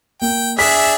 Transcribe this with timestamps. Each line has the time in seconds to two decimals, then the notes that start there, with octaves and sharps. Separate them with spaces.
0.22 A#3 G5
0.59 D4 G#4 E5 B6